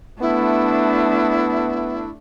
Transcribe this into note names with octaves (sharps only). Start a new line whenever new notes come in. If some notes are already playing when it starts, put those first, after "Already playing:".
A3 B3 D4 E4